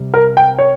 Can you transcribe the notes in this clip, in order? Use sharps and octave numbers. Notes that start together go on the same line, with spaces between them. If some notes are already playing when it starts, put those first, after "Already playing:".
Already playing: C3 G3
A#4
G5
C#5